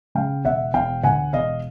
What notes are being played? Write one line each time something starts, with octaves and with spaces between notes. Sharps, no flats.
C#3 F5 G5
E1 E5 F#5
E1 F5 G5
D2 F#5 G#5
E1 D#5 F5